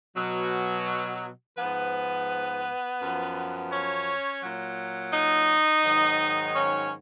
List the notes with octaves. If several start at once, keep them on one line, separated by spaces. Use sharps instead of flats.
B2 F#3
G#2 F3 B3 B4
F#2 F3
C#4 C#5
A#2 F#3
D#4 D#5
G#2 D#3 F#3
C#4 C#5